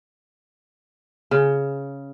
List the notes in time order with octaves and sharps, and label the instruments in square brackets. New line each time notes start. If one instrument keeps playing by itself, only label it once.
[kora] C#3